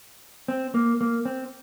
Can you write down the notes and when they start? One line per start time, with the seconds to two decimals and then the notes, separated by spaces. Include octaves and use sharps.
0.48 C4
0.74 A#3
1.01 A#3
1.25 C4